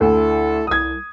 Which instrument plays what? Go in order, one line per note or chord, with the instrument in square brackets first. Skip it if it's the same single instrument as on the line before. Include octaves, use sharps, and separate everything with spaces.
[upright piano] D2 [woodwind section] E4 A4
[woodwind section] C2 [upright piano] D#6 G#6